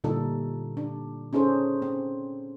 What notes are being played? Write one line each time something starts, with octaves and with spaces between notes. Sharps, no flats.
A#2 D3 G3 D#4 A4
D4
C#4 D#4 G#4 A4 C5
C4